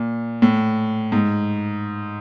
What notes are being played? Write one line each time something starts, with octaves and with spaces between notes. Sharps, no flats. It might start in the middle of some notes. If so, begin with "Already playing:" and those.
Already playing: A#2
A2
G#2